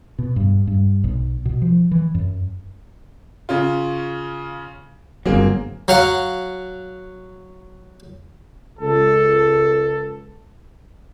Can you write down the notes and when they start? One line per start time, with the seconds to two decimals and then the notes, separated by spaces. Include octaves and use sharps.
0.19 B2
0.36 G2
0.67 G2
1.04 B1
1.45 B2
1.62 F3
1.91 E3
2.15 F#2
3.49 C#3 C#4 F4
5.26 G1 F#3 A#3 C4 G#4
5.88 F#3 F5 F#5
8.79 C#2 A4